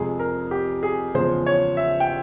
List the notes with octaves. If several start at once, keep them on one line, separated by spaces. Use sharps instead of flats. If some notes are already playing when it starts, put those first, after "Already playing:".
Already playing: F2 C3 F3 G#3 G#4
A#4
G4
G#4
E2 C#3 F3 G#3 C5
C#5
E5
G5